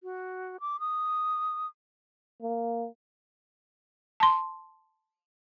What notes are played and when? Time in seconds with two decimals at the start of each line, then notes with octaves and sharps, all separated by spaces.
0.03 F#4
0.60 D6
0.80 D#6
2.42 A#3
4.20 A5 C6